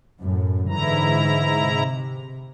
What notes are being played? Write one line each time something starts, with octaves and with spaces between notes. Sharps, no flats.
F#2 A2
G#2 D3 E3 E4 A#5
C3